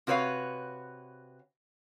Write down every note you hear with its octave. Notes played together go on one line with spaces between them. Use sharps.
C3 F#4 B4 C#5 F5